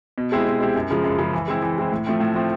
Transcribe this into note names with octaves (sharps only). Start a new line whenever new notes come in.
B2
G#3 C4 E4 G4
B2
G#3 C4 E4 G4
F#2
C#3 F3 G#3
F#2
C#3 F3 G#3
E3
G#3 C4 E4
E3
G#3 C4 E4
A2
F3 A3 C4
A2
F3 A3 C4